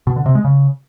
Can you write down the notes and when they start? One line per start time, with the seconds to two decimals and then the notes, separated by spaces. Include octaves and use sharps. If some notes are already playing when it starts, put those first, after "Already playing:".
0.07 B2
0.16 D3
0.26 C3
0.35 G#3
0.45 C#3